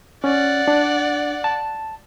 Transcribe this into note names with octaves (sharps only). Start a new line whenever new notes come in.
C#4 D5 F#5
D4
A5